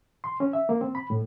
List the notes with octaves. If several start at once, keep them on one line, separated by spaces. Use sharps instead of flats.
C6
C#4
E5
A#3
C4
B5
A2